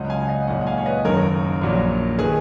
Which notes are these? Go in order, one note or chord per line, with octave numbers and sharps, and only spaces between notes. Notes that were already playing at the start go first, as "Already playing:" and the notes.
Already playing: C#2 C#3 F#3 D#5 F#5
F5 G#5
D#5 F#5
B1 A#2 G#3 D#5 F#5
F5 G#5
C#5
B4 D#5
F#1 F#2 D#3 A#4 C#5
A#1 A#2 F#3
D#3 G#4 B4